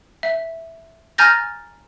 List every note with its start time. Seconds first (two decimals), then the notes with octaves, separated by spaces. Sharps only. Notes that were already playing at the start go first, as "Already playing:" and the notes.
0.23 E5
1.18 G#5 A#5 F6 G6 A6 A#6